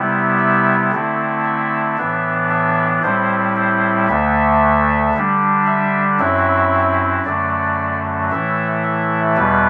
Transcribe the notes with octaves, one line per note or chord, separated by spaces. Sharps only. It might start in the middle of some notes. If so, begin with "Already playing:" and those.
Already playing: C3 G3 B3 E4
E5
D3 A3 C4 E4
E5
A2 E3 B3 D4 E5
E5
A2 G3 C4 E4 C5
C5
D2 D3 A3 E5
D3 G3 D4
E5
F#2 F#3 C4 E4 E5
F#2 D3 F#3 A3 D5
A2 E3 A3 E4 E5
E5
E2 B2 G3 B4